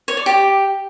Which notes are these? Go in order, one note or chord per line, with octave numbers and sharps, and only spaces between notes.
C#5
D5
G4